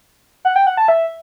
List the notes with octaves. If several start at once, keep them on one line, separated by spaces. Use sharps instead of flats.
F#5
G5
F#5
A5
E5